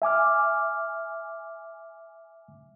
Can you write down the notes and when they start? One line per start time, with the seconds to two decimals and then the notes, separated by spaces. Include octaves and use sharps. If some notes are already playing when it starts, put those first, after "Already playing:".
0.02 E5 G#5 D6 F6